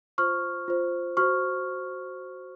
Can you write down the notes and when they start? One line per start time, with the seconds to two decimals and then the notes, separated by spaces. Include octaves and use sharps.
0.18 F4 C5 C#6 F6
0.68 F4 C5
1.17 F#4 C5 C#6 F6